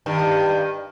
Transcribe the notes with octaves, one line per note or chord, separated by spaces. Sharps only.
G2 D#3